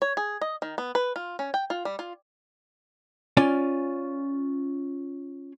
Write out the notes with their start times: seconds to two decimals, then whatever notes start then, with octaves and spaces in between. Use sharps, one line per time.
0.02 C#5
0.17 G#4
0.41 D#5
0.62 D#3
0.78 B3
0.95 B4
1.16 F4
1.39 C#4
1.54 G5
1.70 F4
1.85 G3
1.99 F4
3.37 C#4 F4 D5 G#5